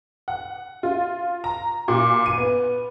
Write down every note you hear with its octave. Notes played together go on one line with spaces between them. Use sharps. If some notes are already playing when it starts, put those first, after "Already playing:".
F#5
F4
A#5
A#2
D#7
B3